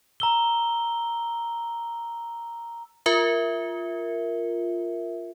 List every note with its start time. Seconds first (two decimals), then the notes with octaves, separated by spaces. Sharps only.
0.20 A#5 E6 G7
3.06 F4 A#4 E5